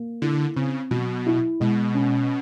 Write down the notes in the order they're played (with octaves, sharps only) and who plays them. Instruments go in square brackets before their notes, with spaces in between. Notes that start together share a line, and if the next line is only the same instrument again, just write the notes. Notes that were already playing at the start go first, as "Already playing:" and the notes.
Already playing: [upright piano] A#3
[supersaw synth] D3 [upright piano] E4
[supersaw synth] C#3 [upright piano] C4
[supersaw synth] B2 [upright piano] F#3
[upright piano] E4
[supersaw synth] B2 [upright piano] G#3
[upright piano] C#4